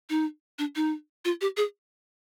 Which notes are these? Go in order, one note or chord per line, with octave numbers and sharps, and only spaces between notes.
D#4
D4
D#4
F4
G4
G#4